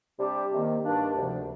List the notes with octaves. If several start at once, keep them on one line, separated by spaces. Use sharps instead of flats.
C3 G3 D4 G4
C3 D#3 A#3
G2 D#3 A#3 D4
D2 C3 F3